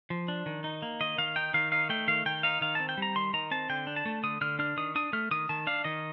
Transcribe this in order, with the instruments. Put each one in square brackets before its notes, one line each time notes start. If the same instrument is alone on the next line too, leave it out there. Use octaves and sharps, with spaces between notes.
[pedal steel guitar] F3
D4
D#3
D#4
A#3
D#3 D#5
D#3 F5
D#4 G5
D#3 F5
D#4 F5
A3 G5
D#3 F5
D#3 G5
D#4 F5
D#3 F5
C4 A5
G5
G3 A#5
D#3 C6
D#3 A#5
C4 A5
D3 G5
D4
A5
A3
D3 D#6
D3 F6
D4 F6
D#3 D#6
D4 D#6
A3 F6
D#3 D#6
D#3 A5
D4 F5
D#3 D#5